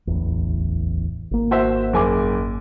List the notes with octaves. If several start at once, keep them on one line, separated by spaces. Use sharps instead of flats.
D1 A1 E2
G#1 A#3
F#4 C5 E5
F#1 G#5 D6